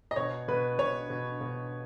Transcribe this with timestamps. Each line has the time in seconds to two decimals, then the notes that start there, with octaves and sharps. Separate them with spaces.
0.11 D#5
0.16 B2 C#5
0.48 B2 B4
0.78 B2 C#5
1.10 B2
1.41 B2